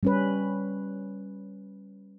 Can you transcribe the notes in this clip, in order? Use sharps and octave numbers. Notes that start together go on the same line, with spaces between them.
G3 C#4 B4